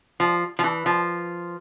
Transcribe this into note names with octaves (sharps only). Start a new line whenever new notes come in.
F3
F3
E3
F3